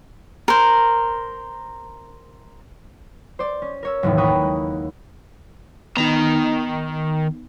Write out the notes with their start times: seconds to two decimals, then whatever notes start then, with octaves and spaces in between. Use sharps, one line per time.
0.48 A#4 C5
3.39 C5 D5
3.62 C#4
3.83 A#4 C#5 E6
4.03 F#1 D#2 A2 E3
4.17 G5 A#5 B5 C#6 D#6 F#6
4.41 G#3
5.97 D#3 B3 D#4 A#5